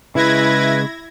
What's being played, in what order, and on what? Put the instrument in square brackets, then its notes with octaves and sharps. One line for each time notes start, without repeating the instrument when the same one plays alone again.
[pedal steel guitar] C#3 G#3 [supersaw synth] E4 G#6 A#6 [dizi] B4